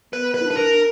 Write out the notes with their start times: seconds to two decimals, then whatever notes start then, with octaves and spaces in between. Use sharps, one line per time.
0.13 B3 B4
0.34 B4
0.41 E4
0.46 D4 B4
0.57 A#4